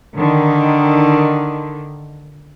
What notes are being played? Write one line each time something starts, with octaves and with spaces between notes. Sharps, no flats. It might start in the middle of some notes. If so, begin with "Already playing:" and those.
D3 D#3